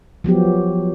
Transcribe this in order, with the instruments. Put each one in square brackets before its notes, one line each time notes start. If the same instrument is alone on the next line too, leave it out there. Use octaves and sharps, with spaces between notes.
[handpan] F3 F#3 B3 G4